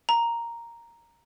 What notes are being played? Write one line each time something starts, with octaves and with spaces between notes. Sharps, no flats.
A#5